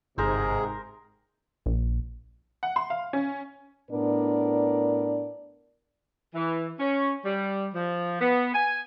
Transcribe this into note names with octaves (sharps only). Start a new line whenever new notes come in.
G1 G#2 C3 G#4 A#4 C5
A#1
F#5
C6
F5
C#4
A2 B3 D4 A#4 D5
E3
C#4
G3
F3
B3
G#5